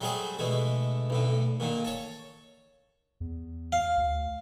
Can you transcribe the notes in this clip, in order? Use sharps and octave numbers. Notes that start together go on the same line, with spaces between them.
F#3 G3 A3 C4 G#4 C5
B2 D3 G#3 A3
B1 A2 D3
A#2 D3 D#3
A4 C#5
E2
F5
D2